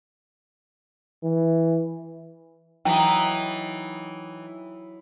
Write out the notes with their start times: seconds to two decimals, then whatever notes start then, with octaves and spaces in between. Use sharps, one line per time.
1.24 E3
2.85 E3 F#3 D#4 D#5 G5